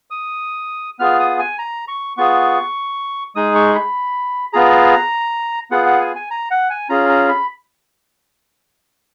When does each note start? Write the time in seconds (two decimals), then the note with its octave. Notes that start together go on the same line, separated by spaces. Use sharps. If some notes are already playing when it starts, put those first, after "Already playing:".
0.10 D#6
0.99 B3 F4 G#4 F6
1.19 D#6
1.39 G#5
1.59 A#5
1.88 C#6
2.17 B3 F4 G#4 C#6
3.35 G#3 D#4 G#4 D#6
3.55 C#6
3.75 B5
4.53 B3 F4 G#4 A#5
5.71 B3 F4 G#4 F#5
5.86 F#5
6.00 G#5
6.15 G#5
6.31 A#5
6.51 F#5
6.70 G#5
6.89 C#4 F4 G#4 A#5
7.09 A#5
7.29 B5